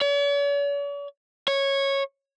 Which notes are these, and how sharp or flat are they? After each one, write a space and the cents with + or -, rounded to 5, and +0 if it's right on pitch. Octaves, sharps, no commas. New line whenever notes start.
C#5 +45
C#5 -10